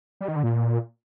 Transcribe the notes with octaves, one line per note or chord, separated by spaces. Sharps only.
G3
D#3
D3
A#2